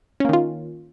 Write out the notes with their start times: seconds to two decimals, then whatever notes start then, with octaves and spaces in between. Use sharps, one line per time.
0.20 C#4
0.25 A#3
0.29 D#3
0.33 F4